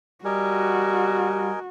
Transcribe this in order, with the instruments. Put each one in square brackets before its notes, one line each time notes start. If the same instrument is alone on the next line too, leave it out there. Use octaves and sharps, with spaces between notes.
[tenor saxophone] G3 [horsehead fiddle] F#4 [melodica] A#4 D#5 G#5